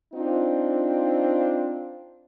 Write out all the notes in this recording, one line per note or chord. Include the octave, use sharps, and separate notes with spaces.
C4 D4 D#4 F4